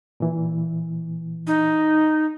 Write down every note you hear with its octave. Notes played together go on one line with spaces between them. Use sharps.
A#2 E3
D#4